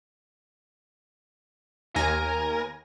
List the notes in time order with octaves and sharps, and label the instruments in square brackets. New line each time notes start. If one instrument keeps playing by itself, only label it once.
[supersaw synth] D#2 G#5 A#6 [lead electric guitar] A#4